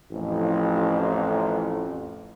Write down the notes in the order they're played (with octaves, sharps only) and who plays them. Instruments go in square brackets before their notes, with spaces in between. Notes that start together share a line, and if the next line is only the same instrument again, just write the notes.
[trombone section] A1 F2